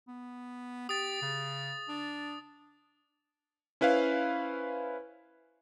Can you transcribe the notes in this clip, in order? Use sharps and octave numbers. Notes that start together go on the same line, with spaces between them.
B3
G4 D#6 A6
C#3
D4
C#4 E4 B4 C5 F5